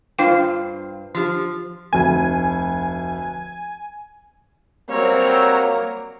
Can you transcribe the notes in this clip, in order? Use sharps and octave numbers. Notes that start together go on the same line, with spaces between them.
G2 D4 F4 C5 F5 G5
F3 D4 G4
F1 D2 G#5
F#3 G3 A#3 C4 C#5 A#5